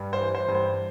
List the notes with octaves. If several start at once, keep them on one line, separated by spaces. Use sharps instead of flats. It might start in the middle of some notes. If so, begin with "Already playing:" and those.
Already playing: G2 G3
C5
E3
C5
G2
C5